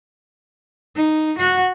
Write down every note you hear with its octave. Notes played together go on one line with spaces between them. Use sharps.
D#4
F#4 F#5